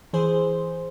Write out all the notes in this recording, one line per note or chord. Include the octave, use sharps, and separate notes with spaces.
E3 G#4 C5